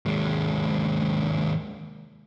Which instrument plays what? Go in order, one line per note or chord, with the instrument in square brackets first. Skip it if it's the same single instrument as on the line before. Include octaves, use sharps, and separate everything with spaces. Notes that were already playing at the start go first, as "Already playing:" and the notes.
[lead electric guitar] D#2 G#3